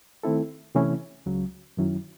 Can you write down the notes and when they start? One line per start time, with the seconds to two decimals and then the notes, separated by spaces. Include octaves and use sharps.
0.23 D#3 A3 C4 E4 A4
0.75 C3 E3 A3 C#4 E4
1.26 C#2 C#3 F#3
1.77 F#2 D#3 F#3 C#4 E4